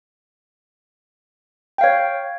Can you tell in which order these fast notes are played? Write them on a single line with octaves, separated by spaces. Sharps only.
G5 F5 C#5